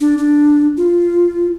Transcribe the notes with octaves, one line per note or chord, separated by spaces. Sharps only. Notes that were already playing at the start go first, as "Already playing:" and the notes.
D4
D4
F4